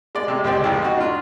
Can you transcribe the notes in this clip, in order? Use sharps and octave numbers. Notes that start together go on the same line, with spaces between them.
G#3 D5
C3 G#3
C#2 G#3 C4 G4 D5
C2 F2
D#4 F#4
D4 F4